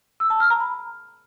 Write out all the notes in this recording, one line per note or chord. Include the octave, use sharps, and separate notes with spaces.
E6
A5
F6
A#5
B5